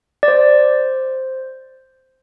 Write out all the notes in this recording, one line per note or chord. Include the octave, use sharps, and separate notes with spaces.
D5
C5